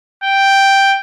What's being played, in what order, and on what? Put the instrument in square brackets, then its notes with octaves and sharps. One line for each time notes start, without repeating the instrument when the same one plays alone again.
[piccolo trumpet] G5